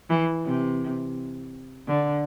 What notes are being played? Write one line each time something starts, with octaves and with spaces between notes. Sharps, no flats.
E3
C3
D3